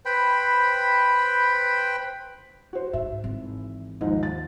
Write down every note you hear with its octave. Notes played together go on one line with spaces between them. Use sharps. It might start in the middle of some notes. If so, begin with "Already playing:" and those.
B4 C5 G5 B5
F#4 C5
G#2 E5
G#1 E3
D#2 G#2 F3 D#4
A6